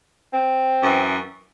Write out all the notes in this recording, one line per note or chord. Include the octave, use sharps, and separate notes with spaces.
C4
F#2 E3